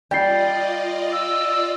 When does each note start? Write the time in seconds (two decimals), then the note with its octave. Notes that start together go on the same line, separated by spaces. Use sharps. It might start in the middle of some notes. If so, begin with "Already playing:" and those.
0.11 G3 F4 D5 D#5 G5 C7
1.13 E6